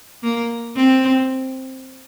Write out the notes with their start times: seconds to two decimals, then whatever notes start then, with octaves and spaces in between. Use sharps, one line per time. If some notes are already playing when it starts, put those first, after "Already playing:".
0.24 A#3
0.76 C4